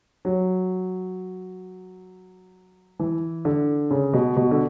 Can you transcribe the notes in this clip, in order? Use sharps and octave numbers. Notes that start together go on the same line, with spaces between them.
F#3
E3
D3
C#3
B2
B2
D3